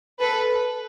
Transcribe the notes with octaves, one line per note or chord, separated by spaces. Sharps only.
A4 B4